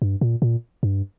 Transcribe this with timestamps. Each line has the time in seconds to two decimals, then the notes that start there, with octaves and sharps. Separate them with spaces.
0.02 G2
0.21 A#2
0.42 A#2
0.83 G2